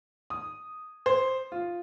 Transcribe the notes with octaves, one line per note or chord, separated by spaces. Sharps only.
D#6
C5
F4